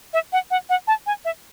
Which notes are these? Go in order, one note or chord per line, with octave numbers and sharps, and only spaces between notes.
E5
F#5
F#5
F#5
A5
G#5
E5